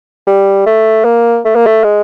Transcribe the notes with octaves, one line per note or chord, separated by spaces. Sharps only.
G3
A3
A#3
A3
A#3
A3
G#3